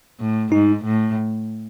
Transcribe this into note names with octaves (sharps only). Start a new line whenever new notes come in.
A2
G#2 D#4
A2